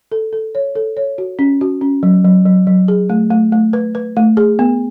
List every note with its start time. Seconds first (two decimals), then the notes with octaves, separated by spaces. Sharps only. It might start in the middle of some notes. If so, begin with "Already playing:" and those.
0.12 A4
0.33 A4
0.55 C#5
0.75 A4
0.97 C#5
1.18 F#4
1.39 C#4
1.61 F#4
1.81 C#4
2.03 F#3
2.25 F#3
2.46 F#3
2.67 F#3
2.88 G#4
3.10 A3
3.31 A3
3.52 A3
3.73 B4
3.95 B4
4.17 A3
4.37 G#4
4.59 B3